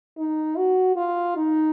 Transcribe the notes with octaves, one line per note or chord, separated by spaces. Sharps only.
D#4
F#4
F4
D#4